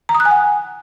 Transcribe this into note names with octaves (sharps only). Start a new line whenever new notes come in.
A#5
D#6
F#6
G#5
F#5